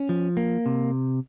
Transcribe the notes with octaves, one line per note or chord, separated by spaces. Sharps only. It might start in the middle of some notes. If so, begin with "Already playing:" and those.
Already playing: C#4
F3
A#3
C3